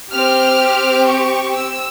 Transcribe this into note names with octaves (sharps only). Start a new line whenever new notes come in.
C4 G4 F6
C#6
E6